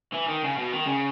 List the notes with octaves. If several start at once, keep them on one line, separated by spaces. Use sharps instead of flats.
E3
D#3
C#3
B2
D#3
C#3